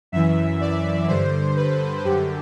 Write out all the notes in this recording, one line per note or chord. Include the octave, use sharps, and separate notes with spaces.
F#2 E3 E5
D5
G2 D3 C5
B4
F#2 D3 G4